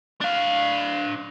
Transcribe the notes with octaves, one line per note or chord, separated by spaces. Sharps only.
D4 F5